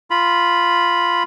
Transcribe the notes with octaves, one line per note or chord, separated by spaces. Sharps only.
F4 B5